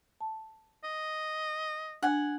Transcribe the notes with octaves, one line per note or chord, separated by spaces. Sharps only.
A5
D#5
D4 F#5 G#5